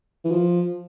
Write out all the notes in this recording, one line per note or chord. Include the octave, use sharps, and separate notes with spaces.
E3
F3